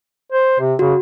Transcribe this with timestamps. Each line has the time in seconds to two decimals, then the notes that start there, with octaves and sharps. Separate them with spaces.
0.32 C5
0.60 C3
0.79 C#3 F#4